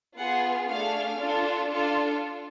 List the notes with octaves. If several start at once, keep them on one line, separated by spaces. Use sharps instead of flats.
B3 F4 G#4 F#5
A3 D4 G#4 F5
D4 F4 A4
D4 F4 A4